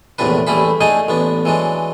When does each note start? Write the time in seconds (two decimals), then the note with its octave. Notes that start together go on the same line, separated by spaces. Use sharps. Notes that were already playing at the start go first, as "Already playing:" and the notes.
0.18 A#1 E2 A2 C3 D4 B4
0.47 A1 G3 A3 E4 G#4 B5
0.81 A3 D4 D#4 G#4 D#5 G#5
1.08 A1 B3 D4
1.45 E3 F#3 G#3 D4